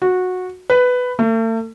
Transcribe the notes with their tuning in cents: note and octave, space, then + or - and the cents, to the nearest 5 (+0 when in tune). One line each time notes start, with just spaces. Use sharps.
F#4 -15
B4 +10
A3 +40